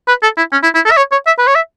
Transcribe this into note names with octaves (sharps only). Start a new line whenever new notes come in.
B4
A4
E4
C#4
E4
E4
A4
E5
C#5
C#5
E5
B4
C#5
E5